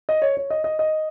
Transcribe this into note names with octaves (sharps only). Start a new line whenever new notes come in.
D#5
C#5
C#5
D#5
D#5
D#5